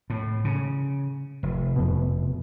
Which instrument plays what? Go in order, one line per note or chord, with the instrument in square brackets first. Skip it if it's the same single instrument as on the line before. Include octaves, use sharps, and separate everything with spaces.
[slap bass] A2
C#3
F1
[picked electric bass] F2 B2